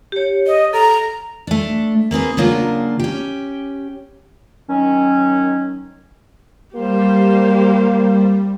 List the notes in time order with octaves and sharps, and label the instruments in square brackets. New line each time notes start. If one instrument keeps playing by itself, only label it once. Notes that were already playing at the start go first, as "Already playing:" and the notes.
[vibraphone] G4 C#5
[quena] D#5
[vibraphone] A4 [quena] A#5
[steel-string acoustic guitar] A3 D4
A#3 C4 G#4 B4
C#3 F#3 A#3 D4 F4
C#4 G4
[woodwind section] D#3 F#3 C#4
[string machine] G3 [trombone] A#3 [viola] G4 C5